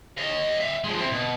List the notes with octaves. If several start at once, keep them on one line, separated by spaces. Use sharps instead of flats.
D#5 F5
E5 F5
F3 G#3
C4 E4
B2